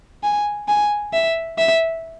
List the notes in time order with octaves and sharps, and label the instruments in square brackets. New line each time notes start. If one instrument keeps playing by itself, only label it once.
[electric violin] G#5
G#5
E5
E5